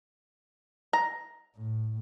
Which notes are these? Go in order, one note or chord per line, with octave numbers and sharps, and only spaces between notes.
A#5
A2